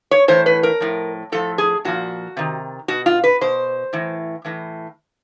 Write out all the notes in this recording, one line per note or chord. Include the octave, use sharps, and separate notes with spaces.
C#5
A2 E3 C5
B4
A#4
A2 F3
A2 F3 A4
G#4
A#2 F3 F#4
C3 D#3
B2 F#4
F4
B4
B2 C5
A2 E3
A2 E3